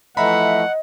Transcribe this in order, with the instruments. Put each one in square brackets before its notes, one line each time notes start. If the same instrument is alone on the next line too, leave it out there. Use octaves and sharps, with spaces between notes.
[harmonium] E3 F3 A3 [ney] D#5 [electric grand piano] E5 A#5 B5 [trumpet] F#5